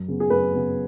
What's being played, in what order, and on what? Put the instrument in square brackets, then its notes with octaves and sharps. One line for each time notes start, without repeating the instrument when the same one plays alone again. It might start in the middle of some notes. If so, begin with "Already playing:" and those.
Already playing: [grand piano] F#2
C#3 B3
G#4
F#2 B4
C#3 B3